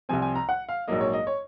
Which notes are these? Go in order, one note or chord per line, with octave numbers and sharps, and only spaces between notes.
C2 C3 F3 C4 G#5
G#5
A#5
F#5
F5
A#1 G#2 F#3 A#3 D#5
C#5
D#5
C#5